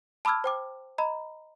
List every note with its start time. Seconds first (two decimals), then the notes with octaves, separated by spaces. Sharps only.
0.25 A5 B5 D6 E6 F6 G#6
0.44 C5 G5 D6
0.98 D#5 A#5 B5